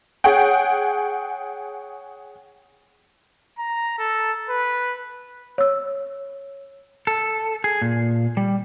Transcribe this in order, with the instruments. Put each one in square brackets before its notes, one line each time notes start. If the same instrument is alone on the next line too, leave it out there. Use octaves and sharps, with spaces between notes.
[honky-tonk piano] G#4 C#5 F#5 G5
[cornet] A#5
A4
B4
[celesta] C#5 E6
[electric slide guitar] A4
G#4
A#2
G3